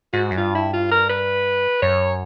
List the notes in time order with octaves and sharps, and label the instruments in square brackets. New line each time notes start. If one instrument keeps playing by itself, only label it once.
[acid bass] G#2 [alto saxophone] F#4
[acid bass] F#2
[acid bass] G2 [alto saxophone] F4
[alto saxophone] E4
F4
A#4
B4
[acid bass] F#2 [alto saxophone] C#5